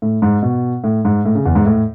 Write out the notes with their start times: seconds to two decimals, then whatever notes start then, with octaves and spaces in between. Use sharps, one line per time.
0.02 A2
0.22 G#2
0.42 B2
0.84 A2
1.05 G#2
1.25 A2
1.35 C#3
1.45 E2
1.55 G#2
1.66 A2